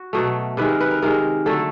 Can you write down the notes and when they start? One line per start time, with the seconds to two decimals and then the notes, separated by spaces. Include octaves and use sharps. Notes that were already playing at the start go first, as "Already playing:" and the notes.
Already playing: F#4
0.13 B2 F#3 A3
0.57 C3 D#3 G#3 B4
0.69 A#4
0.80 B4
0.91 A#4
1.02 C3 D#3 G#3 A#4
1.46 D3 F#3 A3 A4